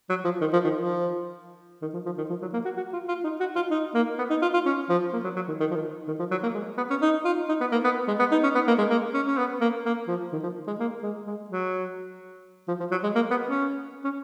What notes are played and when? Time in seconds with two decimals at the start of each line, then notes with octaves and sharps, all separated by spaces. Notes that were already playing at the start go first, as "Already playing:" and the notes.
0.10 F#3
0.25 F3
0.41 D#3
0.53 F3
0.64 D#3
0.76 F3
1.82 D#3
1.94 F3
2.06 F3
2.18 D#3
2.29 F3
2.42 F#3
2.53 A#3
2.65 F#4
2.77 F#4
2.93 F4
3.08 F4
3.24 D#4
3.40 F#4
3.56 F4
3.71 D#4
3.94 A#3
4.19 B3
4.30 D#4
4.42 F4
4.54 F4
4.66 C#4
4.89 F3
5.13 A#3
5.24 F#3
5.36 F#3
5.48 D#3
5.60 D#3
5.71 F3
5.76 D#3
6.08 D#3
6.19 F3
6.31 F#3
6.43 A#3
6.54 G#3
6.77 B3
6.90 C#4
7.02 D#4
7.25 F4
7.49 D#4
7.61 B3
7.72 A#3
7.84 B3
8.08 G#3
8.19 B3
8.32 D#4
8.43 C#4
8.55 B3
8.67 A#3
8.78 G#3
8.90 A#3
9.14 C#4
9.27 C#4
9.38 B3
9.61 A#3
9.85 A#3
10.08 F3
10.32 D#3
10.43 F3
10.67 G#3
10.80 A#3
11.03 G#3
11.27 G#3
11.50 F#3
12.68 F3
12.80 F3
12.91 F#3
13.03 G#3
13.15 A#3
13.31 B3
13.47 C#4
14.05 C#4